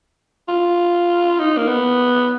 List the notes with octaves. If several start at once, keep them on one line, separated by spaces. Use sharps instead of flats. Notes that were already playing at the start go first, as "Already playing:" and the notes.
F4
D#4
A#3
B3